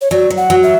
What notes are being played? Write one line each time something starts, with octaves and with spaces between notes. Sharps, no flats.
C#5
F#3 D5
F#3
F#5
F#3
E5